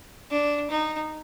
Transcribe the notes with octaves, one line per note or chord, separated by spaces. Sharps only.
D4
D#4